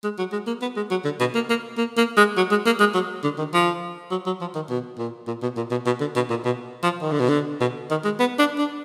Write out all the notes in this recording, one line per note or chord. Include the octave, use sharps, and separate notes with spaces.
G#3
F#3
G#3
A#3
B3
G#3
F#3
D3
B2
A#3
A#3
A#3
A#3
G#3
F#3
G#3
A#3
G#3
F#3
D3
D#3
F3
F#3
F#3
F3
D#3
B2
A#2
A#2
B2
A#2
B2
B2
D3
B2
A#2
B2
F3
D#3
D3
B2
D3
B2
D#3
G#3
B3
D4
D4